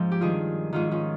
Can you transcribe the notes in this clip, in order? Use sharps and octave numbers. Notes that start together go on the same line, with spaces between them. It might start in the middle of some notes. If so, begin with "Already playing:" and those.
Already playing: G#2 F3 C4 D#4
G4
G2 D#3 F4 G#4
G#2 D#3 F4 G#4
C#4 F4